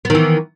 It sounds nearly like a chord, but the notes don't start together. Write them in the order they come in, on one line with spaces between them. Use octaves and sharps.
B3 D#3 E3